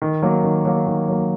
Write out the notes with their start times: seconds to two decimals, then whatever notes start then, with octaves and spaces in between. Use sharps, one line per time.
0.02 D#3
0.22 F#3 A#3
0.44 D#3
0.65 F#3 A#3
0.87 D#3
1.08 F#3 A#3